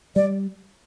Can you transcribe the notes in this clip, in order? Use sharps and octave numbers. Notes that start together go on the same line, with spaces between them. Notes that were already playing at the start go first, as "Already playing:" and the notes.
G3 D5